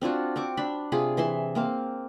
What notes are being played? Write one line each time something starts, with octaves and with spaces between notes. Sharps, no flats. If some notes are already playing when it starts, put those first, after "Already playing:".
C4 D4 F4 F#4
C4 C#6 D6
D4 B5
C3 F4 G#4 B5
E3 E5 C6
A#3 C4 F5